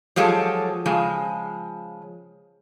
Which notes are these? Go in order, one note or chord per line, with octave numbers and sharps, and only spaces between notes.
F3 F#3 G#3 G4 A4
C#3 F3 G#3